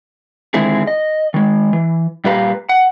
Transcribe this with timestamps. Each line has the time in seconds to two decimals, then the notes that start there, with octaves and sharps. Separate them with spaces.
0.54 D3 D#3 G#3 C4 E4 G#4
0.87 D#5
1.34 D#3 G#3
1.73 E3
2.24 A#2 G3 G4 B4 F5 A#5
2.69 F#5